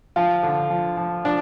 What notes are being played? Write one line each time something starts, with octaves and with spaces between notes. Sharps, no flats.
F3 F4
D3
F3
F3
F3 D4